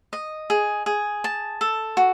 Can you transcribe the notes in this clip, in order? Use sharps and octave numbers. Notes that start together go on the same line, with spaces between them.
D#5
G#4
G#4
A5
A4
F#4